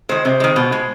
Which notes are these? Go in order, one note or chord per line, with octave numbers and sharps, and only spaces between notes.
D#3 G#3 C5
C3 C5
D#3 G#3
B2
G#3